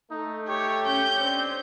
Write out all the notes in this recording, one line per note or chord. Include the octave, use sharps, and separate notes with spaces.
A3 D#4
G4 C#5
C#4 G6
C4 D4